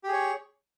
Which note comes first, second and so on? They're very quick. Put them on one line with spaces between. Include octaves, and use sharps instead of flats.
G4 G#4 C#5